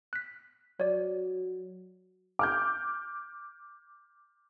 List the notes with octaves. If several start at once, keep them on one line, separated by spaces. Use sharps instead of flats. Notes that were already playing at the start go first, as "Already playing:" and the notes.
F#6 B6
F#3 C#5 D5
D6 F6 G6